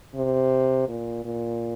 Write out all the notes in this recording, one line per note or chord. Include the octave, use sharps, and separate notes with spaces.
C3
A#2
A#2